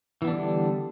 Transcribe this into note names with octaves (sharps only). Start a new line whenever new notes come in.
D3 E3 G3 B3 D4